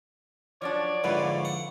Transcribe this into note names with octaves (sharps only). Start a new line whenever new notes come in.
F3 F#3 D4 C#5 D5
F2 G#2 D3 E4 F4 B4
F#5